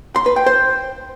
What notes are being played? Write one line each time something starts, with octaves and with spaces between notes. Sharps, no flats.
C6
B4
G5
C5